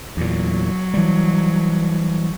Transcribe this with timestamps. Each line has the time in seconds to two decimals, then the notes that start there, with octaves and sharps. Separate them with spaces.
0.17 E2 A#2 F#3
0.94 E3 G3